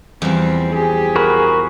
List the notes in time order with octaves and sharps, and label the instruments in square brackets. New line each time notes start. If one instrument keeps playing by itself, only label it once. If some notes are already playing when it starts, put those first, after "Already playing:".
[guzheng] E2 F3 [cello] G3 C4
[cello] G4 [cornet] G#4
[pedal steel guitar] F#4 A#4 B5